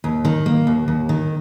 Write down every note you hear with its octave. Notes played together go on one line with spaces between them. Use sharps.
D#2
D#3
A#3
D#2
D#2
D#3